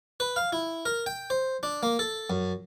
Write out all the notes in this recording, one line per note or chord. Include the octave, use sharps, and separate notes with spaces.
B4
F5
E4
A#4
G5
C5
D4
A#3
A4
F#2